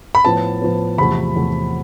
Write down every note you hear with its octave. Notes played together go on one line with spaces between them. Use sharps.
B5
A2 F3 B3 A5
A2 F3 B3
E2 C3 F3 A3 B5
E2 C3 F3 A3